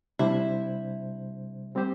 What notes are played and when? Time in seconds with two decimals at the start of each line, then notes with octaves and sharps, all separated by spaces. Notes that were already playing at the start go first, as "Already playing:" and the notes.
0.19 C3 G3 D4 E4 C5
1.75 G3 C4 G4 C5